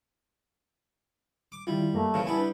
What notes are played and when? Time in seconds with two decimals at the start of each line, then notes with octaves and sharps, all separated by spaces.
1.52 D6
1.67 D#3 G3 E4 F4
1.93 F#2 A3 A#3 A#5
2.14 A#2 C#3 E3 F5
2.26 G3 B3 E4 G4 G#5 A5
2.38 D4 B4